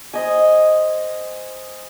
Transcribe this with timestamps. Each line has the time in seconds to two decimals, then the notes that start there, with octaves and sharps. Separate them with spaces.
0.14 C5 D#5 G#5